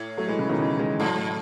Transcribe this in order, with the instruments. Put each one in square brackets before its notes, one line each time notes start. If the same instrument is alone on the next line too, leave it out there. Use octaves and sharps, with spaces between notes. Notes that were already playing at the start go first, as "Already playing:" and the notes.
Already playing: [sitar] A2
[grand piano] F#3 A3
E3 G#3
C#3 E3
B2 D#3
C#3 E3
E3 G#3
[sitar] G#2 [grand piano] F#3 A3